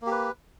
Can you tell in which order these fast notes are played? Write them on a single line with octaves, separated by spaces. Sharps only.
A#3 G4 B4